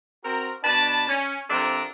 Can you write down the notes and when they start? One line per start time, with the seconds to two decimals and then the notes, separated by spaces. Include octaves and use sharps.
0.23 C4 F#4 A#4
0.64 B2 D4 B4 A5
1.08 C#4
1.49 C3 F3 D4 A4 A#4